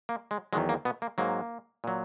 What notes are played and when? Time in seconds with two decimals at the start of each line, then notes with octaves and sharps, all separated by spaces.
0.09 A#3
0.31 G#3
0.53 E2 D#3 F#3 G#3
0.69 A#3
0.85 B2 B3
1.02 A#3
1.18 G#2 F#3 A#3
1.84 A#2 F#3